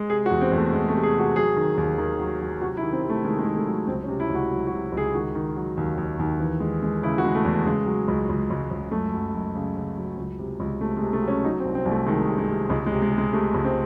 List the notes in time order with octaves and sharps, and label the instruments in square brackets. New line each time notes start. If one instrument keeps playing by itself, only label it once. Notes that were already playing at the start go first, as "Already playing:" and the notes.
Already playing: [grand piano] G#3
C3 G#4
F#4
E2
C4
E2 A3
E2 G#3
A3
C3
G#4
C3 F#4
F#3 G#4
D#3
D#2
D#3
F#3
F#3
C3 F#4
E4
D#3
C4
C3
A3
D#3 G#3
G#3
D#3
A3
F#3
C#2 C4
C#4
C3
E4
C#2
F#4
F#3
F#4
C3
C#2
G#4
D#3 F#4
D#3
F#3
D#2
D#2
D#2
E3
G#3
G#3
C#3 E4
F#4
G#3
A3
E2
C#3 G#3
F#3
C#2
C#2
C#2
C#2
F#2 A3
F#2
F#2
C#3
C#3
F#3
C#2
C3
C#2
C3 A3
G#3
C3
A3
F#3
C#4
F#3 D#4
C4
C2
C4
C2
A3
D#3 G#3
C3
G#3
C3
C#2 G#3
G#3
C3
G#3
C3
G#3
C3 A3
C#2
C4